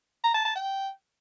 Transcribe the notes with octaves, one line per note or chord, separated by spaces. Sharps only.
A#5
A5
A5
G5